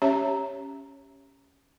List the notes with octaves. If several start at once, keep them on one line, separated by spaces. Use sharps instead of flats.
C#4 G4 C#5 E5 A#5